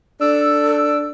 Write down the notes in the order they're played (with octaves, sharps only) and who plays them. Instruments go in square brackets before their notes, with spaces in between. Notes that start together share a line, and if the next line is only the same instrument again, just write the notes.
[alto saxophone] D4 [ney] A4 [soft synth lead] E6